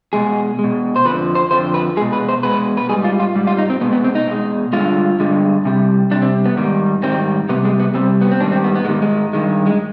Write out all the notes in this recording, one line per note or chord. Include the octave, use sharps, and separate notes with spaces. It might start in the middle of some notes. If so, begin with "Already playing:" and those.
B2 G#3 G#4
G#3
B2
C5
F2 D3 F3 B4
C5
F2 D3 F3 C5
B4
B2 G#3 G#4
B4
C5
B2 G#3 B4
B4
G#2 G3 G#4
F4
F4
G#2 G3
F4
D#4
C4
B2 G#3 B3
B3
C4
D#4
B2 G#3
G2 D3 G#3 F4
G2 D3 G#3
C3 G3
C3 G3 D4
C4
B3
G#2 D#3 G3
G#2 D#3 G3 C4
C3 G3 B3
G#3
B3
C3 G3 C4
B3
C4
G#2 D#3 G3 D4
C4
B3
B3
G#2 D#3 G3 G#3
G#3
G2 D#3 G#3
G#3